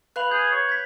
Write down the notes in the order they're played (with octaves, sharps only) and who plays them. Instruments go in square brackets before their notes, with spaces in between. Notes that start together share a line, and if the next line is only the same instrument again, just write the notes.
[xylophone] B4 F5 B5 [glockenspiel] F#6 F7 F#7
[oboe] G#4 [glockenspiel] G6
[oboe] C#5
[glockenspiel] G#6 B6